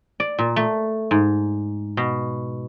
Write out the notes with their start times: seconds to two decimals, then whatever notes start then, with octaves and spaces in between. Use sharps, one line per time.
0.20 D5
0.39 A#2
0.56 A3
1.11 G#2
1.97 B2